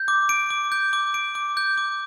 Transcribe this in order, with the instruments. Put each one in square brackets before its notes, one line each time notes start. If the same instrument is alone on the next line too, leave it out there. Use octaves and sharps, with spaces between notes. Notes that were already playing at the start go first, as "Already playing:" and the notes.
Already playing: [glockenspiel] G6
D6
D7
D6
G6
D6
D7
D6
G6
D6